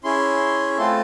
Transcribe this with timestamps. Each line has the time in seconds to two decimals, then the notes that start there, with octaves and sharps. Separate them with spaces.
0.04 C#4 E4 G#4 C6
0.77 A3 C4 F4 A4 C6